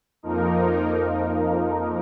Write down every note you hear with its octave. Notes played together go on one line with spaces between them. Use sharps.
F2 F3 A#3 D#4 A#4